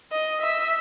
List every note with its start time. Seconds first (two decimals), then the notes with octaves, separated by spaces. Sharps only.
0.12 D#5
0.42 E5